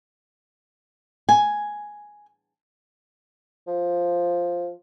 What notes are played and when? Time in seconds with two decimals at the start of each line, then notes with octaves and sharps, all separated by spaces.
1.29 G#5
3.68 F3